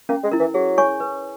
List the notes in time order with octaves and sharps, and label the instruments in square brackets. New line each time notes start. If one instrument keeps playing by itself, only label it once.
[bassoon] A#3 [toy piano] C#4
[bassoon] G#3
[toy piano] E4 A#4
[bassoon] E3
[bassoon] F#3 [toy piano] G#4
[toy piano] C#5 G#5 C#6
B4